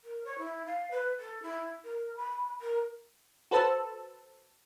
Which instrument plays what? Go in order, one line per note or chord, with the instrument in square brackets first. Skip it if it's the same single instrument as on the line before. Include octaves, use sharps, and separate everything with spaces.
[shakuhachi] A#4
C#5
E4
F5
B4
A4
E4
A#4
B5
A#4
[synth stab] F#4 A4 B4 C5 A5 E6